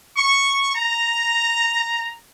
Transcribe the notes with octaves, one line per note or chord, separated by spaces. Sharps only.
C#6
A#5